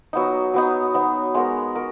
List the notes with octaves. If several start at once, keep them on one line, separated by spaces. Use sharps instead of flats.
F#3 B3 D#4
F#3 B3 D#4
F#3 B3 D#4
G#3 B3 F#4 A#4
F#4 A#4